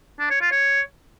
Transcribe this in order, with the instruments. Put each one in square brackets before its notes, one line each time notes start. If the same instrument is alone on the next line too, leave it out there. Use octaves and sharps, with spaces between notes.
[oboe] D4
C#5
F4
C#5